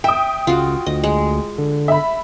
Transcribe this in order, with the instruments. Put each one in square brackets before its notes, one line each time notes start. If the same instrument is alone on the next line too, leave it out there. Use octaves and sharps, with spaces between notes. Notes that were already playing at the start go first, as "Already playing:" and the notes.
[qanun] E5 [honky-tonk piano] G5 D#6
[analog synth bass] C#2 [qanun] F4 F#4
[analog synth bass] D2 [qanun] D#5
[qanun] G#3
[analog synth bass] D3
[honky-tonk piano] E5 B5